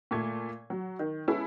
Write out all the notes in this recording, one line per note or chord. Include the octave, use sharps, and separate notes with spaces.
A#2 A3 G#6
F#3
D#3
G#3 B3 C#4 E4 G#4 A4